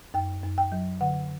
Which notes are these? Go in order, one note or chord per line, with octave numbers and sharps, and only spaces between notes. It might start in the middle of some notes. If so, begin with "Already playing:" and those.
F#2 G5
F#2
G5
F#3
D3 F#5